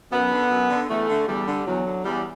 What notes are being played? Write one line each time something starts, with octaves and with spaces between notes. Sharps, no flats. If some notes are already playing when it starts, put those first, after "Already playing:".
F#2 B3
D3
F#2
D3
E2 A3
D3
E2 G3
D3
E2 F#3
D3
E2 G3